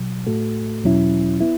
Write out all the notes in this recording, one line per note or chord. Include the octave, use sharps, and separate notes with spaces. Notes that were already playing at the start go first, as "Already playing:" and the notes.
Already playing: B2 F#3
A2 A3 F#4 A4
E2 B2 F#3 C#4 E4
B3 E4